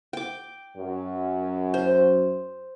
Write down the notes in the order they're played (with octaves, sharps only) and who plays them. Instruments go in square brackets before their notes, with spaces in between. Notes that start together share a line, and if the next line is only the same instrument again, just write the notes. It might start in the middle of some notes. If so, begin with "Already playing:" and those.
[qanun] G5 D6
[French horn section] F#2
[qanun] C5